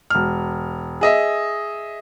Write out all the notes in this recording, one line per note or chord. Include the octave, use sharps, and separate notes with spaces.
E1 F6
G#4 D#5 E5